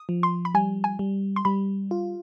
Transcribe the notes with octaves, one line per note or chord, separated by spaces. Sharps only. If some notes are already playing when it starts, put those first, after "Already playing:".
Already playing: D#6
F3
C6
B5
G3 G#5
G#5
G3
C6
G3 B5
F4